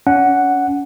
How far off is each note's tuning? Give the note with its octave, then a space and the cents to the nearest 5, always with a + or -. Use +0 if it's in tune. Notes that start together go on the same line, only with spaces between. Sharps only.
C#4 +40 F#5 +0